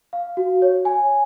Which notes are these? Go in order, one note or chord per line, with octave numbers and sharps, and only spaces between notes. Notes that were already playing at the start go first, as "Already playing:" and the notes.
F5
F#4
C#5
G#5